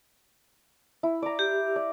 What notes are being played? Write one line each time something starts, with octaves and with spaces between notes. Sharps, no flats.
E4
D5 A#5
G4
D5